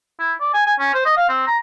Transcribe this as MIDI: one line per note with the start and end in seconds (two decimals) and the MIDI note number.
0.20 0.33 64
0.41 0.51 74
0.54 0.64 80
0.66 0.74 80
0.79 0.91 61
0.94 1.04 72
1.06 1.14 75
1.17 1.29 77
1.29 1.43 60
1.47 1.58 82